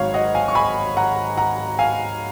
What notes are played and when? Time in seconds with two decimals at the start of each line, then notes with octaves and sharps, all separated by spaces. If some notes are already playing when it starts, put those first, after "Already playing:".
Already playing: G#1 G#2 F#3 C#5 F5
0.14 D#5 F#5
0.35 F5 G#5
0.48 C#6
0.55 G#5 B5
0.97 F#5 A#5
1.37 F#5 A#5
1.79 F5 G#5